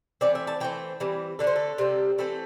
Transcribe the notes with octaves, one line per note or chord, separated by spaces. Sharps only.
E3 A3 C4 D5
E5
A5
E3 A3 C4 G5
E3 G3 C4
D3 A3 D4 A4
C5
A4
C3 G3 C4
E3 A3 C4 A4